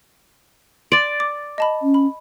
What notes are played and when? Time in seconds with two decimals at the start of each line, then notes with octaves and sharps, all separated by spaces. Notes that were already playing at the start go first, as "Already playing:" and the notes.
0.92 D5 C6 A6
1.20 D6
1.58 D#5 A5 B5
1.82 C#4
1.94 B5